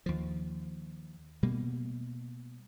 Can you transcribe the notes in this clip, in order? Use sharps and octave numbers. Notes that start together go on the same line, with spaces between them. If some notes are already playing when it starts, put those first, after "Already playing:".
D#2 F3
B2 G3 A#3